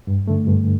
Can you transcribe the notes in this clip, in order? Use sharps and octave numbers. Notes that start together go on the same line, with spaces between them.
G2
D3 A3
G2